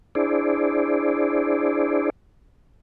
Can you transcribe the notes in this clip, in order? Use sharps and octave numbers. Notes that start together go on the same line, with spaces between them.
D4 E4 G#4 C5 D5